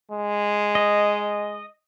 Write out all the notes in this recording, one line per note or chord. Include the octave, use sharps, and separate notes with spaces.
G#3
D#5